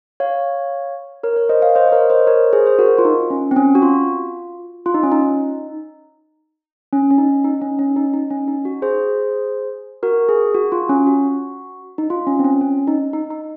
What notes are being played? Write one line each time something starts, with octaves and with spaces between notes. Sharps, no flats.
C#5 F5
A#4 C#5
A#4 C#5
C5 D#5
C#5 F5
C5 D#5
C5
A#4 C#5
C5 D#5
A#4 C#5
G#4 C5
C5
F#4 A#4
F4
D#4
C#4
C4
C#4
F#4
F4
F4
D#4
C#4
D#4
C#4
C#4
D#4
D#4
C#4
C#4
D#4
D#4
C#4
D#4
F#4
G#4 C5
F#4 A#4
G#4
F#4
F4
C#4
F#4
D#4
F4
C#4
C4
C#4
C#4
D#4
D#4
D#4